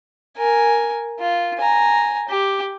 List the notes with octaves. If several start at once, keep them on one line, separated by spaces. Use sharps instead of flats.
A#4 G#5
F4
G#5 A#5
G4